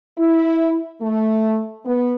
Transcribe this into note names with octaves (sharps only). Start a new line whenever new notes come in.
E4
A3
B3